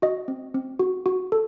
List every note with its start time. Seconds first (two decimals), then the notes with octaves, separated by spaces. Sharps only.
0.02 F#4 D#5
0.28 C4
0.54 C4
0.79 F#4
1.06 F#4
1.32 A4